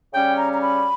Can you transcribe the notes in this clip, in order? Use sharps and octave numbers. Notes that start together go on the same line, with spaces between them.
C#3 G3 C#4 G5
A#5
A#5
B5